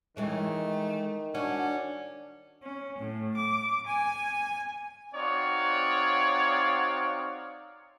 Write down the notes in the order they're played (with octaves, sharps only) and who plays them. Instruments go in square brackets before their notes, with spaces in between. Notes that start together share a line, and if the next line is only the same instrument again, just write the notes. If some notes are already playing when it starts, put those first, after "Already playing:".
[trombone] D#3 [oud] E3 G#3 C#4 [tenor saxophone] A3
[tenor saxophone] C#4 [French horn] D4 [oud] F#4
[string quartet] C#4
A2
D6
G#5
[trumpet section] C4 D#4 F#4 C#5 D5 F5